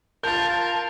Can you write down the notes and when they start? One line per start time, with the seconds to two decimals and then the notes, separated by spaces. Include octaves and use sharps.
0.23 F4 A#4 A5 G6 A6